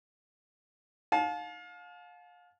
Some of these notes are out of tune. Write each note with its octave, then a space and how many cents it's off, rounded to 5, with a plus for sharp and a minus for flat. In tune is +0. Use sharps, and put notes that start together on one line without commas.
F5 +30 A5 -35